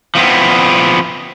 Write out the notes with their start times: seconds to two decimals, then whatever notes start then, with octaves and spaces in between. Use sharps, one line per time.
0.15 F3 B3 C4 E4